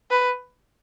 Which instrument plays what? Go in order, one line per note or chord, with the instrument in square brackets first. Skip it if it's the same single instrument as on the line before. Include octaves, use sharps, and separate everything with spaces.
[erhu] B4